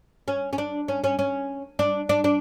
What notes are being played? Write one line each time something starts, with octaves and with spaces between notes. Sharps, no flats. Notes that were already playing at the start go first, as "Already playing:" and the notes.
C#4
C#4
D4
C#4
C#4
C#4
D4
D4
D4